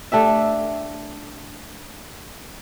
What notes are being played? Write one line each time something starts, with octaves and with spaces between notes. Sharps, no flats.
A3 D4 G4 E5